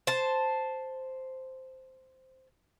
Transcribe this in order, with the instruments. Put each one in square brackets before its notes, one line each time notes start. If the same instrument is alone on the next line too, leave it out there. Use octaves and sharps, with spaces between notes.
[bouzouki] C5 A5